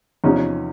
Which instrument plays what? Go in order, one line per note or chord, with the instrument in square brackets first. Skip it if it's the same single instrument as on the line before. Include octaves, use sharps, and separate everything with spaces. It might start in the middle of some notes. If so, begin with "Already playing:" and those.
[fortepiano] E2 C3 F3 C#4 D#4